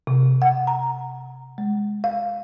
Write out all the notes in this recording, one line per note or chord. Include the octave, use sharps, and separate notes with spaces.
C3
F#5
A#5
G#3
F5